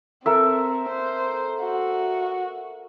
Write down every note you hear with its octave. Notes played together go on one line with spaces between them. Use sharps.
C4 A4 A#4 E5
C5
F#4